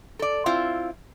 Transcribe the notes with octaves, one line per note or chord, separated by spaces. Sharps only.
A4 D5
C4 E4 F4